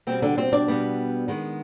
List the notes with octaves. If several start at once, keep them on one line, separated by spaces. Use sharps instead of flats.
B2 G3 B3 C4
D3 D4
C4 C5
D4 D5
B2 G3 B3
D#3 G#3 B3